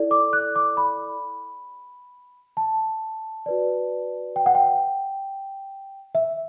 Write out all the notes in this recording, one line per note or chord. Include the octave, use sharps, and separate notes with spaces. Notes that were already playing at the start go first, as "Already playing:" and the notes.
Already playing: E4 A4 D5
D6
F#6
D6
B5
A5
F#4 B4 D5
G5
F#5
G5
E5